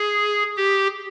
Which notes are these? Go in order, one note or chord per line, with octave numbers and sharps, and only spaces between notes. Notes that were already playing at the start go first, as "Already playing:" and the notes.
Already playing: G#4
G4